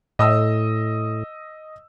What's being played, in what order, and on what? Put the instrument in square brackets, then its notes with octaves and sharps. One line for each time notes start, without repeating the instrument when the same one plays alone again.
[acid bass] A2 [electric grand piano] D#5 D#6 E6